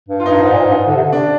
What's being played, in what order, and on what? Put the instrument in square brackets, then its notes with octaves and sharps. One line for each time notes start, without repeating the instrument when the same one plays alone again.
[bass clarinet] G2
[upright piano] F4
[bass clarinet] G2 [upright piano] D#4
[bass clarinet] G#2
A#2
G#2
G2
G#2
D3
C3
D3
[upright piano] D4